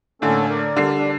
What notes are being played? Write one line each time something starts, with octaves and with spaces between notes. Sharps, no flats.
A2 D3 A#3 C#4 A4
A#4 D5
D3 G3 C7
D4